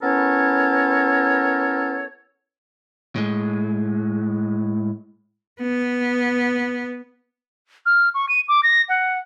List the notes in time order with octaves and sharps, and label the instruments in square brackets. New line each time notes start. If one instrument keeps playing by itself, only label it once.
[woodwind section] B3 C#4 E4 A4 A#4 C#5
[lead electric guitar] A2 G#3
[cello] B3
[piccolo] F6
C#6
D#7
D6
A#6
F#5